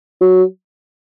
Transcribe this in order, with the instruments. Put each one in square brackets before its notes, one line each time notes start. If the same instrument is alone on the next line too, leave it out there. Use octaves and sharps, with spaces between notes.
[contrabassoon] F#3